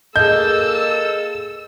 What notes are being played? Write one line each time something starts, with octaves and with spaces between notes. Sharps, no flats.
A#3 G#4 A4 D#5 A5 E6 G6